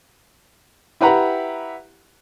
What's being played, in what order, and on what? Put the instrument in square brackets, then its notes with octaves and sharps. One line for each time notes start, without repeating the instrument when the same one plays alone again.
[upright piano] E4 G4 B4 F#5 A#5